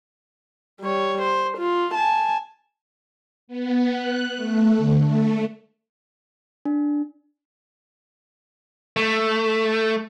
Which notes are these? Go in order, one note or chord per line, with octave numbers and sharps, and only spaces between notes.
G3 C#5
C5
F4
G#5 A5
B3
F#6
A3
D3
A3
D4
A3